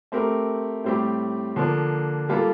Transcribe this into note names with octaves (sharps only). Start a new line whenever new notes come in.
A3 C4 G4 A#4
A2 G3 C4 G4
D3 F3 A#3
G3 A#3 F4 A4